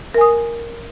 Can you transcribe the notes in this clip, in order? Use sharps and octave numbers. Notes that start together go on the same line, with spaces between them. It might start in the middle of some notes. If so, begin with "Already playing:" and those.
A#4 G#5 D#6